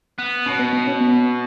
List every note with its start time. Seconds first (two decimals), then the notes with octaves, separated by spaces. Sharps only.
0.19 B3
0.46 B2 C#4
0.59 B3
0.73 B3
0.87 C#4
1.01 B3